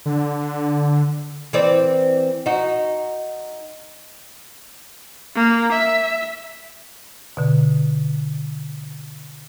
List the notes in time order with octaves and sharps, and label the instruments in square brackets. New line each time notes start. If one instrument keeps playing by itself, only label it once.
[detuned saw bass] D3
[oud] E3 C4 D5
D#4 F#4
[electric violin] A#3
E5
[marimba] B2 D3